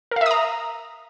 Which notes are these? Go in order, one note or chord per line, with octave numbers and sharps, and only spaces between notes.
A#4 E5 F5 A#5 D#6